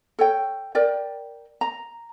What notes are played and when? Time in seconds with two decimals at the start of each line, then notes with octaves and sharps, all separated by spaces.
0.19 A4 C#5 G5
0.75 A#4 D5 G5
1.61 A#5